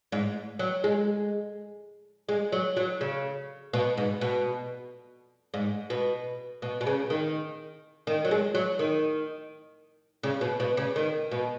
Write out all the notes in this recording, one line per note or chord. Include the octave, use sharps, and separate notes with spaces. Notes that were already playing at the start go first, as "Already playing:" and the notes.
G#2
F#3
G#3
G#3
F#3
F#3
C#3
B2
G#2
B2
G#2
B2
B2
B2
C#3
D#3
D#3
F#3
G#3
F#3
D#3
C#3
B2
B2
C#3
D#3
B2